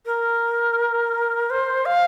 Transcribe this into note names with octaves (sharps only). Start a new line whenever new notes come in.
A#4
C5
F5